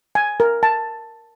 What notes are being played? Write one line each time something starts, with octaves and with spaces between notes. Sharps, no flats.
G#5
A#4
A5